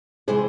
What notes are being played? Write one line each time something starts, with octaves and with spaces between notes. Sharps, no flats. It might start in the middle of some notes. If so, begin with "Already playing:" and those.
C3 E3 G#3 G#4 C5